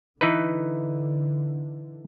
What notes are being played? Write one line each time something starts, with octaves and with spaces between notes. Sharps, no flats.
D3 E3 D#4 B4